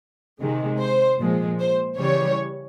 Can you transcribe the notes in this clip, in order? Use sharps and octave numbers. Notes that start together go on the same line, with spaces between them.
C3 D#3 G#3
C5
A#2 F3 G#3
C5
C#3 E3 G3 C#5